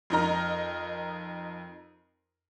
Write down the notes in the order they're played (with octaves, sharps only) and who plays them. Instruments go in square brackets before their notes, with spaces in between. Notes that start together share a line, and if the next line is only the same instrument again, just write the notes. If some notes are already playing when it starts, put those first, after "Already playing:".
[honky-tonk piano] F2 D#4 A#4 A#5